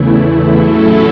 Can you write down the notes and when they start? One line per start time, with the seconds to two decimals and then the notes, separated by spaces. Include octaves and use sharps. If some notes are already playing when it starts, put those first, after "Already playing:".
Already playing: E2 C#3 E3 A3 E4
0.55 A2 F#3 C#4 E4 A4